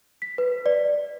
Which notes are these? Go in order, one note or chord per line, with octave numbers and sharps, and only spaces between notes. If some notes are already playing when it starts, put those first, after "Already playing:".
B6
B4
D5